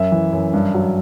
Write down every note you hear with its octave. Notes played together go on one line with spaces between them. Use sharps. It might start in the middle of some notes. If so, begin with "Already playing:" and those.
Already playing: F#2 E5
E3
F#2
G2
F#3